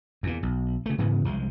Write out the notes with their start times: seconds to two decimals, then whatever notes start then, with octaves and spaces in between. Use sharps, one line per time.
0.23 E2 A#2
0.43 B1
0.86 C#3 A3
0.98 G#2 C#3 E3 B3
1.25 C2 F3 G#3